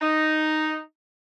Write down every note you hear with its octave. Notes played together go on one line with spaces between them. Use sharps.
D#4